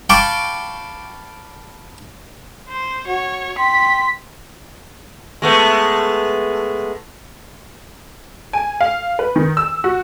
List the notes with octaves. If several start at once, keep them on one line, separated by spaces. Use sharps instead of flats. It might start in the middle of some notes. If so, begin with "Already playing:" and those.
F5 G5 A5 B5 C#6 D6
C5
F#4 C#5
G5 C6 B6
G#3 A3 B3
G#5
F5
B4
D#3
E6
F#4